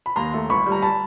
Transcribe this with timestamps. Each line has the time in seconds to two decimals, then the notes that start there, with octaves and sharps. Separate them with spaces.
0.06 B5
0.16 D#2 A#5 C6
0.33 A3
0.49 G1 B5 C#6
0.66 G3
0.72 A#5
0.82 A5 B5